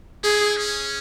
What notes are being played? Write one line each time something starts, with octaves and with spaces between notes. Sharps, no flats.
E4 G#4
C#4